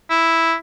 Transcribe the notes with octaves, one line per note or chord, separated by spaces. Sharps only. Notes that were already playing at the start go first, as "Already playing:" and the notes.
E4